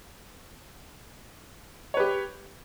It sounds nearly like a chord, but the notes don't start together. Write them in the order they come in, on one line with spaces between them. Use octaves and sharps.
C#5 B4 G4